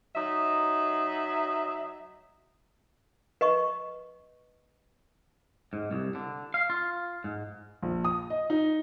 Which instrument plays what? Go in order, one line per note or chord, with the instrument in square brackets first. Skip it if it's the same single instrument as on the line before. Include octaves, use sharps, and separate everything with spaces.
[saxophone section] F#3 D#4 E5
[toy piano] B4 D#5 C#6
[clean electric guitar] G#2
C2
D3
F5
F4
G#2
[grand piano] A#1
D#6
D#5
D#4